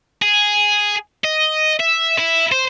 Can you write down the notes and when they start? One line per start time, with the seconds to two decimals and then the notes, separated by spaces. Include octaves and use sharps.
0.22 G#4
1.24 D#5
1.80 E5
2.19 E4
2.52 C5